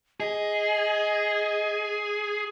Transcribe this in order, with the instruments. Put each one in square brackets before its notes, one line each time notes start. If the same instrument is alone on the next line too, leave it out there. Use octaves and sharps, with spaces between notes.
[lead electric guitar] G#4 [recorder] D#5